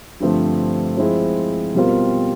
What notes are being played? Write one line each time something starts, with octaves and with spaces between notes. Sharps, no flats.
G2 D3 F3 A3 C4
F3 G#3 C4 E4
B2 G3 C4 F4 A#4